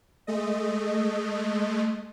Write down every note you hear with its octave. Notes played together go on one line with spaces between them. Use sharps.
G#3 A3 D#5